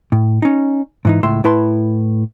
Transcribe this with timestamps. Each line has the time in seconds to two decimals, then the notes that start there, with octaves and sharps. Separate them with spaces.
0.12 A2
0.42 C#4 D#4
1.05 G#2 E3 D#4
1.23 C#2 A2 E5 C6
1.44 A2 E4 B4 A5 C6